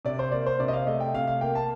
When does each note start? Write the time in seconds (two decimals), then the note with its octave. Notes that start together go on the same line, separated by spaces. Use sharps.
0.05 C3 D5
0.19 C5
0.32 A#3 D5
0.46 C5
0.60 C3 D5
0.68 D#5
0.73 F5
0.87 A3 D#5
1.00 G5
1.14 C3 F5
1.27 F5
1.41 A#3 G5
1.55 A5